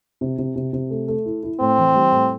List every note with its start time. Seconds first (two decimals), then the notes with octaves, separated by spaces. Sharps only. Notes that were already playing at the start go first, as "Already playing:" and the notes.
0.21 C3
0.38 C3
0.56 C3
0.73 C3
0.90 A3
1.08 A3
1.26 E4
1.43 E4
1.60 A2 C4
1.78 E3
1.95 G3
2.12 A2